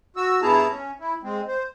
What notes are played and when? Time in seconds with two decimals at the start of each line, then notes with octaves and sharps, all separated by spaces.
0.17 F#4 E6
0.42 G2 B3 E4 G#4 A5 A#5
0.68 C#4
1.00 E4
1.23 G#3 C4
1.48 C5